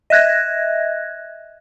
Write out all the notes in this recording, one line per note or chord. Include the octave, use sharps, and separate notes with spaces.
D#5 E5 F#6 G#6 A#6